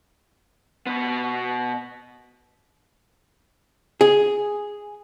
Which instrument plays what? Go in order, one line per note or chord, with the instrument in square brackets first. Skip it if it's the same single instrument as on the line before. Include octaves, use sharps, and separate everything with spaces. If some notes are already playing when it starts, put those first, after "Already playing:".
[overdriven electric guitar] B2 B3
[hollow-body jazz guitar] G#4